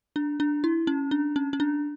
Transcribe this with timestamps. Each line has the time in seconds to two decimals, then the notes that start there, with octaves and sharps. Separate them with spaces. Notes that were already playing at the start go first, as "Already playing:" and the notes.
0.16 D4
0.40 D4
0.64 E4
0.87 C#4
1.11 D4
1.36 C#4
1.53 C#4
1.60 D4